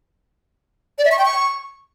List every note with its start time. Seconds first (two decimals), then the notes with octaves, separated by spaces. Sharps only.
0.98 D5
1.05 E5
1.12 C#6
1.19 G5
1.25 C#6